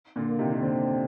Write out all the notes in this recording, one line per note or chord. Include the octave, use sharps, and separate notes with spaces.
A#2 D3
A#3
C3 D#3
D#3
A#2 D3 C4